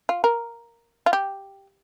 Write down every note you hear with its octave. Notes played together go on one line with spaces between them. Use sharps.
F4
A#4
F4
G4